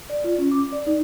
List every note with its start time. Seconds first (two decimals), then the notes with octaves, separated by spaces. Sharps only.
0.10 D5
0.24 F4
0.38 C#4
0.52 D6
0.73 D5
0.87 D#4